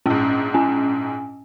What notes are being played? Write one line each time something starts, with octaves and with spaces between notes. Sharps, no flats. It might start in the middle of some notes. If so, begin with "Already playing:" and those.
A#1 G#2 C#4
C#4 G#5